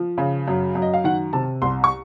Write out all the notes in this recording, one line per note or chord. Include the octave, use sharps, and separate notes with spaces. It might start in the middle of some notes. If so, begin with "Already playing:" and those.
Already playing: F3
C#3
F#2
F#2
D#5
F5
D#3 F#5
C3 A5
C2 C6
C#6